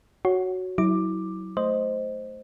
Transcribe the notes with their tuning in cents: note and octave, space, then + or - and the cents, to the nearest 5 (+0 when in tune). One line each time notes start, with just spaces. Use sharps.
F#4 +0 C#5 +0
F#3 +20 E4 -30 D6 +10
A3 -5 C5 +0 D#5 +0